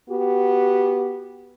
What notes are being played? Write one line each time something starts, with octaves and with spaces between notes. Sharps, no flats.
B3 F#4 G4